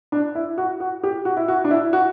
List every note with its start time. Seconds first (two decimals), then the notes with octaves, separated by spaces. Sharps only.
0.12 D4
0.35 E4
0.58 F#4
0.80 F#4
1.03 G4
1.25 F#4
1.37 E4
1.48 F#4
1.64 D4
1.71 E4
1.93 F#4